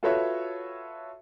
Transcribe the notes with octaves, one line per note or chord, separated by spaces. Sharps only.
F4 F#4 A4 B4 C#5 E5